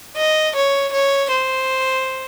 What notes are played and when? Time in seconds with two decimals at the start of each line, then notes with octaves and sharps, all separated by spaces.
0.17 D#5
0.56 C#5
0.93 C#5
1.31 C5